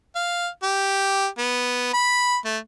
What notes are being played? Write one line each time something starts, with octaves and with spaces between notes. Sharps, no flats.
F5
G4
B3
B5
A3